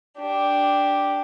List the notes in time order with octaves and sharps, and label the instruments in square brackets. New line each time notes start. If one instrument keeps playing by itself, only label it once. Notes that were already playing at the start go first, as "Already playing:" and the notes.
[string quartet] D4 G4